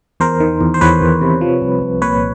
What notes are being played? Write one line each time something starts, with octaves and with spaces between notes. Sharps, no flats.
E2 A#4 C5
D#3
E2
C5
E2 B4 C#5
E2
C3
F3
C2
C2
A#2 B4 C#5